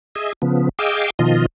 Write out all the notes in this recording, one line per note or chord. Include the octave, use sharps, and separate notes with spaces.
G#4 D#5 E5
C#3 F3 B3
G#4 D#5 F5 G5 D6 E6
B2 D#3 F3 F4 D#5